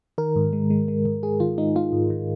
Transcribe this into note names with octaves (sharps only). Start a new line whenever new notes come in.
D#3 A#4
G#2
G#3
G#3
G#3
G#2
G#3 G#4
D#3 F4
G#3 D#4
G#3 F4
G#2
D#3